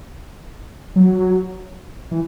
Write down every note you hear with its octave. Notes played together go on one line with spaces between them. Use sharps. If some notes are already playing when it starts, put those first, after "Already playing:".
F#3
E3